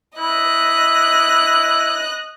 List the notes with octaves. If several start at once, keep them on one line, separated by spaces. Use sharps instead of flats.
E4 D#5 F#6